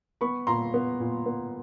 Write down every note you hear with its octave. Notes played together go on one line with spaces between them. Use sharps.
B3 B5 C#6
A#2 A#5 C6
B3
A#2
B3